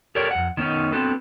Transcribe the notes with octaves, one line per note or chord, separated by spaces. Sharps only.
G4 A4 A#4 C#5 D5
F2 F#5
D#3 B3 C#4 D#4
B3 C4 D4 F#4 A4 B4